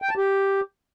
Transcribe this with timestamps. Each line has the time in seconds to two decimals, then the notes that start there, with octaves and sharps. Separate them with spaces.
0.02 G5
0.09 A5
0.17 G4